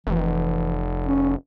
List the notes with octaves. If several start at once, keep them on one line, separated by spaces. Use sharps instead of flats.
F1 E3
C#4